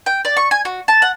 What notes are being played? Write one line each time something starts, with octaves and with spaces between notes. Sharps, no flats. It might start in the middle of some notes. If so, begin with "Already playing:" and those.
G5
D5
C#6
G#5
F#4
A5
F#5